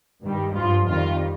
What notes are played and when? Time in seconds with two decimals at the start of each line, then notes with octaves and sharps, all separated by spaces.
0.23 G2 D#3 G3
0.55 G2 F3 F4
0.88 F2 D#3 G3 F4